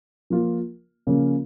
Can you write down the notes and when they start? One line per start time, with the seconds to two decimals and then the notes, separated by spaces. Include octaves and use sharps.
0.30 F3 A#3 F4
1.07 C#3 F3 A#3 C#4